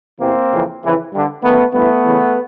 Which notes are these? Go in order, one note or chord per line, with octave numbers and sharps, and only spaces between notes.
E2 C3 E3 A#3 C4
F2 C#3 E3
F2 C#3 E3
G2 D3
F#2 D#3 A3 B3
G2 E3 A3 B3
E2 C#3 E3